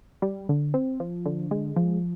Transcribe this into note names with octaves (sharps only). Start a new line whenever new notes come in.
G3
D3
C4
F3
D3
G#3
F3